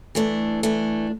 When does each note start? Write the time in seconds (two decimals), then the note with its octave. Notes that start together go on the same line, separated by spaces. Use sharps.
0.15 E3 A3 D4
0.63 E3 A3 D4